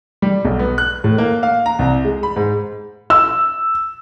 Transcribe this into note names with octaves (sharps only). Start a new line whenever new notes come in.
G3
B1
B3
F#6
A2
A#3
F5
A#5
C2
G#3
B5
G#2
E6